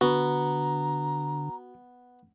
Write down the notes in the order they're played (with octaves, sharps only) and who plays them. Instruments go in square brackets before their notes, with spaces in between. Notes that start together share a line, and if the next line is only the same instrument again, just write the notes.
[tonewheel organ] D3 [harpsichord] B3 [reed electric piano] F#4 [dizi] A#5